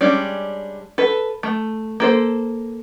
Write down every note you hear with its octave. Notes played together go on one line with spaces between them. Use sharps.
G3 G#3 C#4 D4
A4 B4
A3
A#3 A4 C5